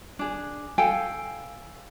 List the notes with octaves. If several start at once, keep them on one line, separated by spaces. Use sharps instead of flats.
D4 G#4
A4 F5 G5 G#5